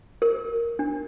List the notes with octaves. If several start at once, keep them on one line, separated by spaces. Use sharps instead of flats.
A#4
D4